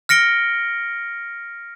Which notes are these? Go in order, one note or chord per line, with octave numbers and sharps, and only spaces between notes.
F6 A#6 C#7 D7 G7